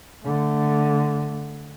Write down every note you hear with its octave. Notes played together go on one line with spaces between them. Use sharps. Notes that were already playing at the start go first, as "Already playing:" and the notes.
D3 A3